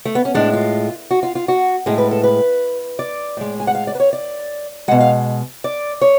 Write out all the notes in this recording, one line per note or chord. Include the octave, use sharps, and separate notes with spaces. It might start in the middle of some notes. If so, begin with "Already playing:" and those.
A3
B3
C#4
A2 G#3 D4
F4
F#4
F4
F4
F#4
A2 G#3 G#4
B4
A4
B4
D5
A2 G#3
G#5
F#5
F5
D5
B4
C#5
D5
B2 G#3 F#5
F5
D5
C#5